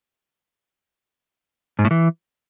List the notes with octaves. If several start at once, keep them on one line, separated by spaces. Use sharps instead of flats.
G#2
A2
E3